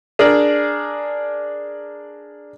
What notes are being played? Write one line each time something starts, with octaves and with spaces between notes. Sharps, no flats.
D4 G#4 A#4 D5